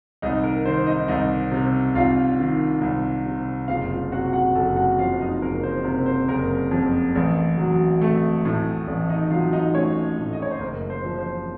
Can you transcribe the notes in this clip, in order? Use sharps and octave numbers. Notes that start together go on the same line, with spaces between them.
C2 D#4 D#5
A#4
D#3 C5
D#4 D#5
C2 D#4 D#5
C3
C2 F4 F5
D#3
C2
C3
F#1 F4 F5
F4 F5
C3 F#4 F#5
F#4 F#5
F#1 A4 A5
F#4 F#5
F2 F4 F5
D#4 D#5
F#1 A#4
C5
C3 A#4
C5
F#1 A#4
F2
A1
F#3
A3
A2
A1
D#4 D#5
F#3 F4 F5
D#4 D#5
A3 C#4 C#5
A2
D#5
C#5
C5
F#1 A#4
C5
F3
C5